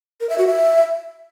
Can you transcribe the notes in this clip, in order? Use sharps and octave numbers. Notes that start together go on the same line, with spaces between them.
A#4
E5
F#4
E5